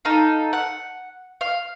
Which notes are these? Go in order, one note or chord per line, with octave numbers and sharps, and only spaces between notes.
D#4 A4 F5
F#5
F5